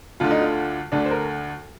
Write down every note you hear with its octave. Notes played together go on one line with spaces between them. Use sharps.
D2 D3 F4
D#4
F4
D2 D3 D4
C5
A#4